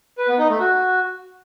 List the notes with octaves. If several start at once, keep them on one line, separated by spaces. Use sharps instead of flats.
B4
B3
D#4
A3
F#4